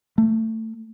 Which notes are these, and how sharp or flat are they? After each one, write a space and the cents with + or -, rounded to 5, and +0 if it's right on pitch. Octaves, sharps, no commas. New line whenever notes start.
A3 +20